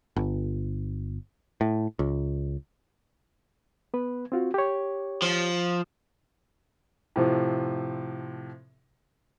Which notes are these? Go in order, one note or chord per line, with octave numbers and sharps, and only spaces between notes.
G1
A2
C#2
B3 B4
C4 F4 F#4
G4 C#5
F3
A2 C3 F3